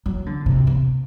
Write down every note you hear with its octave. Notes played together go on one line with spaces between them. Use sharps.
F#3
D3
C3
C3